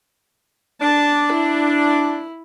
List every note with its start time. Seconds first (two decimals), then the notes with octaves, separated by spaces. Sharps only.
0.82 D4 A5
1.33 E4